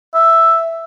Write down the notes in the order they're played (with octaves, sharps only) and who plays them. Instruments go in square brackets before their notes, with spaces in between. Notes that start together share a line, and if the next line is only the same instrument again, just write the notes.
[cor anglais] E5